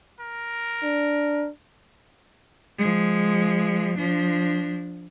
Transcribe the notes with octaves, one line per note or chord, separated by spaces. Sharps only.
A#4
D4
F3 G#3
F3 D4